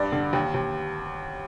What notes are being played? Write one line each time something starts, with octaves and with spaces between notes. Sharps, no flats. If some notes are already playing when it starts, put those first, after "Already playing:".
Already playing: G2 D5
D3
D#2
D#2